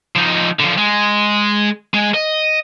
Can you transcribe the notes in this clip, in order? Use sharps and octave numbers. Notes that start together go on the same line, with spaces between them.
F3 D#4
D3 F3
G#3
G#3
D#5